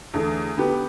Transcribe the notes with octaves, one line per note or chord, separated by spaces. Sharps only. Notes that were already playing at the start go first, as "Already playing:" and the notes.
E2 D3 A3
D3 B3 G4 B4